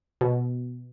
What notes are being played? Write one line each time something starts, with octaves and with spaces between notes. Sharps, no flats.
B2